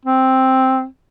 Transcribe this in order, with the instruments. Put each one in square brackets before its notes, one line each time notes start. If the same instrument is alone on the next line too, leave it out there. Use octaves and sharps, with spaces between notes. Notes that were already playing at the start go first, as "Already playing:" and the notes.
[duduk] C4